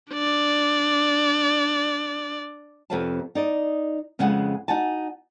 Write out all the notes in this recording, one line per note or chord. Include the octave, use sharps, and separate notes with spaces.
D4 D5
F2 C3 B4 C#5 F5 A5
D#4 D5 D#5
F2 C#3 G#3 B3 G#4 F#5
D#4 F#4 F#5 G#5 A5